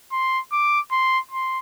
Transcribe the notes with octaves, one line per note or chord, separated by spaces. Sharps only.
C6
D6
C6
C6